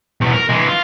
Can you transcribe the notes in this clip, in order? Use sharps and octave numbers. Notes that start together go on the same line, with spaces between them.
E2 B2
A#4
E3 G#3
F4